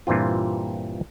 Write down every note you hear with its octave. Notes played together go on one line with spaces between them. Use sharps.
G2 A#2 E3 C4 F4